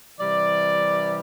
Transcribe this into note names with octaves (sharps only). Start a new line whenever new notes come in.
C3 E3 G3 D5